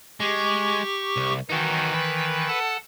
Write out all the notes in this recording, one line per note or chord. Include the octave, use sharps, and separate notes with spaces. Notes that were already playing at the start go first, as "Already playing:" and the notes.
G#3 G4 C#6
C2
D#3 E3 D#4 F#4
B4
A4 F#5 A5